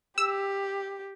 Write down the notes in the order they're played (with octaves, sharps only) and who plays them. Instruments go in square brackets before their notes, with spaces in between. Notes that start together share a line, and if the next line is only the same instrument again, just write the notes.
[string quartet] G4 [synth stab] E6